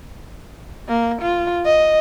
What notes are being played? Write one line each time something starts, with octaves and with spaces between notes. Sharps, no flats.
A#3
F4
D#5